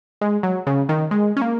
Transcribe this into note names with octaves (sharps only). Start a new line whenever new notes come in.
G#3
F#3
C#3
D#3
G#3
C#4
A#3